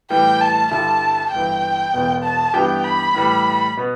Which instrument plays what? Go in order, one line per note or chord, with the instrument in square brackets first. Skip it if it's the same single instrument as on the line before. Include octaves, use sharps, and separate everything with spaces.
[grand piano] A2 E3 G3 [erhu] G5
[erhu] A5
[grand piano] G2 D3 G3 E4 [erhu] A5
[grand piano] G1 G2 E3 [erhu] G5
[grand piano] E1 E2 B2 B3
[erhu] A5
[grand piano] G2 E3 B3 D4 G4 [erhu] G5
[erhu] B5
[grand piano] A2 E3 G3
B2 B3